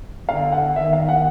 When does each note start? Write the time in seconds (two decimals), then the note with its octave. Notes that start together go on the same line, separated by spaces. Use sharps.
0.29 D3 F5
0.52 F#5
0.76 D#3 E5
0.93 F5
1.09 F#5